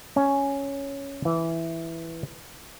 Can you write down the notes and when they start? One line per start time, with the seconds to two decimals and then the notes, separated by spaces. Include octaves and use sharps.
0.16 C#4
1.25 E3